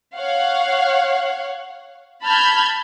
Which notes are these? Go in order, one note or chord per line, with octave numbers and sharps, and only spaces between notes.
C#5 F5 F#5
A5 B5 F6 G6 G#6